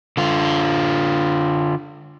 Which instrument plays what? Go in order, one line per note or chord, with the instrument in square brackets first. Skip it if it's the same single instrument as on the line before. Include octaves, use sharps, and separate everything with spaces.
[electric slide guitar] D3 F4